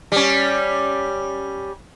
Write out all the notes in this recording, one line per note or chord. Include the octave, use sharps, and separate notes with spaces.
G3 C#4